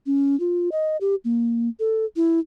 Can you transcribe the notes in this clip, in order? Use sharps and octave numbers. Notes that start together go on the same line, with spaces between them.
C#4
F4
D#5
G4
A#3
A4
E4